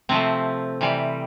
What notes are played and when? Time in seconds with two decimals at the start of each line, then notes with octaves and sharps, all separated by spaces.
0.09 C3 F3 A3 C4
0.81 C3 E3 G3